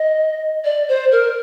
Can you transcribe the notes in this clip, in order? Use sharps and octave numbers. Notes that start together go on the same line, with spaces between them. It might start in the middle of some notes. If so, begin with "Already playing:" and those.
Already playing: D#5
D5
C5
A#4